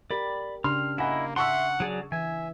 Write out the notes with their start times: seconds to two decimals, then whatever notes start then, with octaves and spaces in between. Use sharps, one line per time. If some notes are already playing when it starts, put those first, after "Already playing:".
0.11 G4 A#4 D5 B5
0.64 C#3 D4 G4 C6 F6
0.98 A#3 E4 D#5 F#5 G#5 B5
1.36 E5 F#5 A5 C6 C#6 E6
1.80 F#3 G#4 D5
2.12 E3 E5 G#5